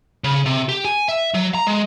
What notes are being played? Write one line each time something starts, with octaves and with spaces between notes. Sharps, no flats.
C#3
C3
G4
G#5
E5
F#3
A#5
G#3